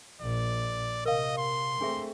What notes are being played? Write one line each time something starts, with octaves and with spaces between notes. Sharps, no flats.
A#1 D5
C3 A#4 D#5 F5
C6
A3 C4 D4 G#4 E5